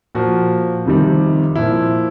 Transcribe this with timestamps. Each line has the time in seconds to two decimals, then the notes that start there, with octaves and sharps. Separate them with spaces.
0.15 A#2 F3 F#4
0.85 F2 C3 D#3 G3
1.56 A#2 F3 E4